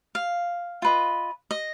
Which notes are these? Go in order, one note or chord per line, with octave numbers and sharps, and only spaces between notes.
F5
F4 B4 D#5
D#5